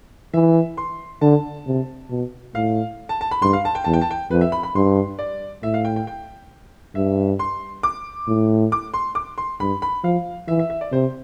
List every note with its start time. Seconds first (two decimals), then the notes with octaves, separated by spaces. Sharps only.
0.34 E3 E5
0.77 C6
1.21 D3 A5
1.67 C3
2.10 B2
2.55 A2 F5
3.09 A5
3.21 A5
3.31 B5
3.42 G2 C6
3.53 F5
3.65 A5
3.75 G5
3.84 E2 A5
3.93 G5
4.01 A5
4.11 G5
4.31 F2 B4
4.41 E5
4.52 B5
4.63 B5
4.75 G2 C6
5.19 D5
5.63 A2 E5
5.74 F5
5.85 G5
5.96 G5
6.07 G5
6.95 G2 E5
7.39 C6
7.83 D6
8.28 A2
8.72 D6
8.94 C6
9.15 D6
9.38 C6
9.60 G2 B5
9.82 B5
10.04 F3 F5
10.48 E3 E5
10.59 E5
10.70 E5
10.81 D5
10.92 C3 C5